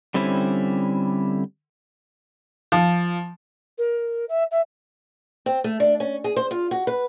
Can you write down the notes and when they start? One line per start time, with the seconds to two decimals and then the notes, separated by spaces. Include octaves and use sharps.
0.14 D3 G3 C4 C#4 E4
2.72 F3
3.78 A#4
4.29 E5
4.51 E5
5.46 C4
5.64 A3
5.80 D4
6.00 C#4
6.24 G#4
6.36 C5
6.51 F4
6.71 F#4
6.87 B4